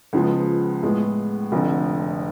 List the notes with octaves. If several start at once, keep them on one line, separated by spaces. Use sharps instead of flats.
C#2 C#3 F3 G#3 B3
A2 G#3 B3
F1 F2 D3